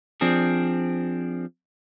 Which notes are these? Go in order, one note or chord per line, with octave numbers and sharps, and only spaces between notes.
F3 C4 D4 G#4